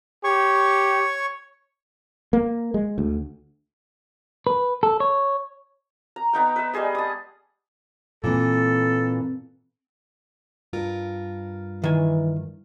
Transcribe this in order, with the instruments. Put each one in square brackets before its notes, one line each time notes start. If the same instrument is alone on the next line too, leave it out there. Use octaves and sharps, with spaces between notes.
[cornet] G4 [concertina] C#5 C#6
[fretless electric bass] A#3
G#3
D2
[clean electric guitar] B4
A4
C#5
[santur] A#5
B3 D#4 G5
B4 E5
G3 G#3 G#4 D#5
A5 D#6
[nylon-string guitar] A#2 E3 [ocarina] C4 [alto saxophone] A4
[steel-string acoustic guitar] G2 F4 A#4
[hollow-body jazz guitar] D#3 G#5 [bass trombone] E3